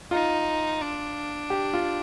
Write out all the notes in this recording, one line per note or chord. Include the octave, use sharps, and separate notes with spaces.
D#4 F4
D4
G4
F4